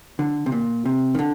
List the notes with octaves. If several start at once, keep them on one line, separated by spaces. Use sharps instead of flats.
D3
C3
A#2
C3
D#3
D3